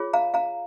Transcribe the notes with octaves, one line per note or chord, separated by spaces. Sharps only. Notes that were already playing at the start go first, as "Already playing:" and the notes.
Already playing: F4 G#4 C#5
F5 A#5
F5 A#5